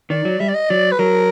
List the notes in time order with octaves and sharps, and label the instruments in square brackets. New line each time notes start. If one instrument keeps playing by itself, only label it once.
[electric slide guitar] D#3 [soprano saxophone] D5
[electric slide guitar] F#3
[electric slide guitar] G3 [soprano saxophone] E5
[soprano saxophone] D5
D#5
[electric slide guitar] F#3 [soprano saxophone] D5
[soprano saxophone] B4
[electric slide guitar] F#3 [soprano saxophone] A#4